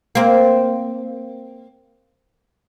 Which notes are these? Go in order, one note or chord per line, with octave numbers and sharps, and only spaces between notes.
A#3 C4